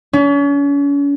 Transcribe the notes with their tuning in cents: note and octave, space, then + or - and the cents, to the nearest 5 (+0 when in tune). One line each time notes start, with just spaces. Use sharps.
C#4 +40